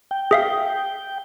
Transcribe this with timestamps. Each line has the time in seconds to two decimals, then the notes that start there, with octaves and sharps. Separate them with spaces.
0.11 G5
0.31 G#4 E5 F5